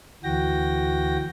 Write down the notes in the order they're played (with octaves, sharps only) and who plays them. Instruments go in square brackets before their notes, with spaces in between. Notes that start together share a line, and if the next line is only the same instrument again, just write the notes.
[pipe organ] D2 E3 F#4 G5 A#6